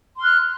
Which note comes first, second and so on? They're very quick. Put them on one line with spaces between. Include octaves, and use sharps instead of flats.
C6 F6 F#6